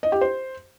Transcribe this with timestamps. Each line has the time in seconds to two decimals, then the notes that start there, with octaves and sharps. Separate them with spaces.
0.03 D#5
0.12 G4
0.21 C5